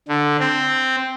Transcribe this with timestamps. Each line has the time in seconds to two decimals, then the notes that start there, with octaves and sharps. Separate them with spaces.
0.08 D3
0.40 C4